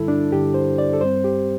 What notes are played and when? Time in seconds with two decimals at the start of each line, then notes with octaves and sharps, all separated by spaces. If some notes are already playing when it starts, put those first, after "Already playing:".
Already playing: G2 D3 G3 E4 A4
0.08 D4
0.32 G2 D3 G3 G4
0.54 C5
0.78 D5
0.93 A4
1.01 G2 G3 C4 C5
1.24 G4